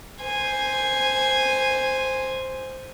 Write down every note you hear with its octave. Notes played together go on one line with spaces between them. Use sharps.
C5 G#5